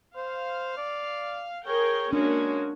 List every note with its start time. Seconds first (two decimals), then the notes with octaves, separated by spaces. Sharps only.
0.16 C5 F5
0.77 D5
1.67 G#4 A#4 C#5 G5
2.13 G#3 A#3 C#4 D4 F#4